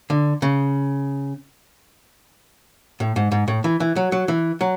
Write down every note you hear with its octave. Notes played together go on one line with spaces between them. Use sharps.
D3
C#3
A2
G#2
G#2
A2
E3
E3
F#3
F#3
E3
F#3